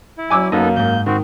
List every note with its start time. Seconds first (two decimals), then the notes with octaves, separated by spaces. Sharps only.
0.18 E4
0.30 F#3 G#5 D6 E6
0.52 F#2 A#3 B3 D#4 A4
0.76 D#2 G#2 G6
1.06 D#3 C4 F#4